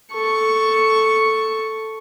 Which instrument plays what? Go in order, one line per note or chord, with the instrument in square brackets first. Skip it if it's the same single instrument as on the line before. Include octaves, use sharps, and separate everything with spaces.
[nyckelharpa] A4 C#6